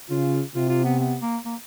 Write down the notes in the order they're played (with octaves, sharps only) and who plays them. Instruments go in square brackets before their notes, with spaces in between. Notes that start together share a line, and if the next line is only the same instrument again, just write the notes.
[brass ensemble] C#3 [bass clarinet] F4
[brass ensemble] C3 [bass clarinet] F4
[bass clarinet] F4
B3
B3
A#3
A#3